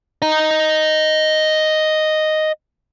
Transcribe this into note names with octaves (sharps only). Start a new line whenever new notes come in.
D#5 A#5